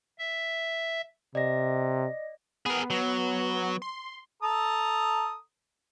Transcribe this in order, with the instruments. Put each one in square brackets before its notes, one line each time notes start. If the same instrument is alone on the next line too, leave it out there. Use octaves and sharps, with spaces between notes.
[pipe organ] E5
[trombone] C3 [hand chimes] D5 D#5 A#6
[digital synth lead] B3 [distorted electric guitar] G#4 A#4
[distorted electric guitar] F#3
[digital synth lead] C6
[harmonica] A4 A#5 D#6